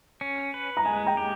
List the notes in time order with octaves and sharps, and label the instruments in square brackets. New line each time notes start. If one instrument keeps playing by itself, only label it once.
[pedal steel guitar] C#4
B4
[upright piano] A#5
[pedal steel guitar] G#3 [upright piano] G#5
[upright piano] G5 A#5
[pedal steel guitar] G4